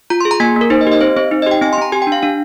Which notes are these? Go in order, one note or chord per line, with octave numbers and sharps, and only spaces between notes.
F4 A#5
C6
G#4
A#5
A#3 G#5
A#3 A#4
D#4 C5
D#5
G4
D#5
C4 C5
C4 C5
D#4
D#5
G4 G5
C4 G#5
C6
C4 A#5
G4 G#5
G5
D4
F5
D4 F5